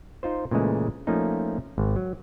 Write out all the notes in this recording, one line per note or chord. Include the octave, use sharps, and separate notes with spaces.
D#4 F4 C5
A#2 C#3 E3 G#3 A3
F3 A3 A#3 C#4 D#4
G#1
F#3